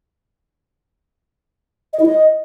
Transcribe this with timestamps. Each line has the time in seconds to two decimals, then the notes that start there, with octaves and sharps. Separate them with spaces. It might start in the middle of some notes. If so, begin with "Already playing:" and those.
1.93 D#5
2.00 E4
2.06 D#5